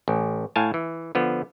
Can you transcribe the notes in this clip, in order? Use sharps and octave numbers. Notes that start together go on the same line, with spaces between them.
A1
A2 F5 G#5 A5
E3
D3 F3 B3